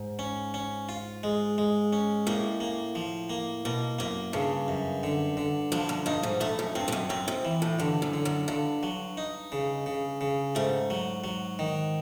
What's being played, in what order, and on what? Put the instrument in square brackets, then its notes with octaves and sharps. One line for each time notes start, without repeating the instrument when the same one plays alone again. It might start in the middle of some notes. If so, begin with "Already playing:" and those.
Already playing: [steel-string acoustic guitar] G#2
[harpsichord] C#4
C#4
F4
G#3
G#3
C#4
[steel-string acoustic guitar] A2 [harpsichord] A#3
[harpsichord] A#3
F3
A#3
[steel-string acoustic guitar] B2 [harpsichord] A#3
[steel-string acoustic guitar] F#2 [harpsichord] A#3
[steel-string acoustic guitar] G2 [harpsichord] C#3
[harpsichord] F#2
D3
D3
[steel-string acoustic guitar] G2 [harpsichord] F3
[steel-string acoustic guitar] F#2
[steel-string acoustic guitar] G2 [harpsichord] D#4
[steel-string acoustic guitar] G#2
[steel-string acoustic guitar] G2 [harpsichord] A3
[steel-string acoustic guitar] F#2
[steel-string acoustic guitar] G2 [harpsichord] C4
[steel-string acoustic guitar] G2
F#2
[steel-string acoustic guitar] F#2 [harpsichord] C4
[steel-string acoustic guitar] G#2
[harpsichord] E3
[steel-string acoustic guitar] A2
[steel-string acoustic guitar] G2 [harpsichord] D3
[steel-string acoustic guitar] F#2
[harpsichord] D3
[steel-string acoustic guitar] F#2
[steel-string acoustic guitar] G2 [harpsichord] D3
[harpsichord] F#3
D#4
C#3
C#3
C#3
[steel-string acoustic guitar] G#2 [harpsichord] A3
[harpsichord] F#3
F#3
D#3